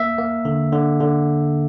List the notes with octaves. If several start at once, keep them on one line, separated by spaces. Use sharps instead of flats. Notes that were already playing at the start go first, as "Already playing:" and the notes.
Already playing: A#3 E5
A#3
D3
D3
D3